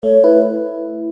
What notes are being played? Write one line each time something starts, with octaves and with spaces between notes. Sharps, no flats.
A3 C#5
E4 B4